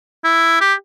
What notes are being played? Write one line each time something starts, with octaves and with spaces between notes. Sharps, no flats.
E4
G4